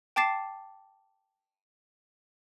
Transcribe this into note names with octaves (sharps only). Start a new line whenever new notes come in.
G5 A5 D6 A6 C7 E7